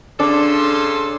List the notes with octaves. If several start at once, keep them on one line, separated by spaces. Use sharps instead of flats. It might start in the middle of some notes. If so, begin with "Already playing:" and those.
C#3 D4 A4 C6